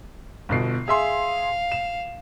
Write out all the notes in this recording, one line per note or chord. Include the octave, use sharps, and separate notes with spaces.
G1 B2 C7
G#4 E5 F5 C6
E7